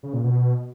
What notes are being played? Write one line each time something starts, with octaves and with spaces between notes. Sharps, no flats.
C#3
A#2
B2